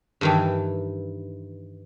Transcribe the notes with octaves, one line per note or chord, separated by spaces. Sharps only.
G2 D#3 E3